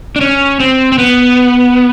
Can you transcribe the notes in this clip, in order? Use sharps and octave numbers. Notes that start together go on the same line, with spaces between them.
D4
C#4
C4
C4
B3